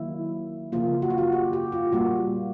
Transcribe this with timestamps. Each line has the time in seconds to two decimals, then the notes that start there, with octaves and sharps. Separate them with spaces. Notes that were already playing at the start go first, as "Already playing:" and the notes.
Already playing: D#3 F#3 A#3 E4
0.72 C#3 F3 A#3 F4
1.02 F#4
1.10 F4
1.18 F#4
1.32 G4
1.53 G4
1.72 F4
1.92 A#2 G3 A#3 F#4